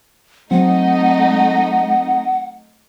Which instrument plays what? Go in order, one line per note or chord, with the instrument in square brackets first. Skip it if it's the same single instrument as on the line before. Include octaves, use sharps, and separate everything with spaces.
[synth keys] F#3 C4 [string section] A3 D#4 D#5 [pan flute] F#5